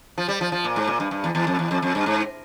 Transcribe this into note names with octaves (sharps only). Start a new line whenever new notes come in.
F3
G3
F3
F3
A#2
G#2
A#2
G2
G2
E2
E2
F2
E2
F2
F2
G2
G#2